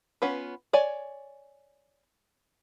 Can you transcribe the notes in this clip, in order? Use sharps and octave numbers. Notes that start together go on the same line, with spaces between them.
B3 C#4 F4 B4
C#5 D5 G#5